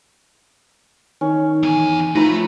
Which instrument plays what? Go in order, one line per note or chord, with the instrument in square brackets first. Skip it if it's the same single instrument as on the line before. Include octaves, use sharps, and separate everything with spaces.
[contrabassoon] D#3 [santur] C#4
[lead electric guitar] E2 G#5
[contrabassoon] F3 [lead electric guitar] A3 [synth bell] D#4 [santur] B4 A#5 B5